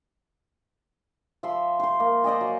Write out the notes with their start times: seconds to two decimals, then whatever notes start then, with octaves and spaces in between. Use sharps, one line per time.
1.43 F3 E5 B5 C6
1.80 C5 C6
2.00 A#3
2.24 C5 D5 D#5 G#5
2.41 F#3 D#5